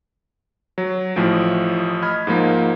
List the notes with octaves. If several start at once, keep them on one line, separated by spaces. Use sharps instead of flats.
F#3
A1 A2 F3 D7
D#5 B5 F6 G#6
G#2 F3 A#3